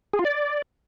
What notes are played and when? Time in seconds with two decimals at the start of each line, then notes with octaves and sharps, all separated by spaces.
0.13 G#4
0.19 F4
0.25 D5